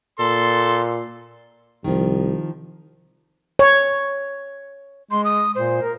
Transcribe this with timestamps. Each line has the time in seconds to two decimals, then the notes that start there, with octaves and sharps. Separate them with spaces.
0.19 A#2 A4 C6
1.84 C2 D#3 F3
3.59 C#5
5.11 G#3 C6
5.25 D#6
5.55 A#2 C5
5.82 A#4